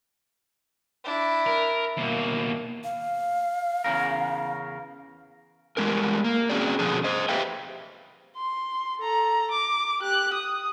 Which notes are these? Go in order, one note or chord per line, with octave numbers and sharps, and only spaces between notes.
D4 E4
A#4
D#2 B2 A#3
F5
E2 C#3 A#4
E3 G3 G#3 C#4 A#4
A#3
C4 C#4 F#4 G#4 D5
B2 D3 F3 D4 G#4
C5 D#5
G4 B4 E5 F5 G5
C6
A4 A#5
D6
G4 F#6
D#6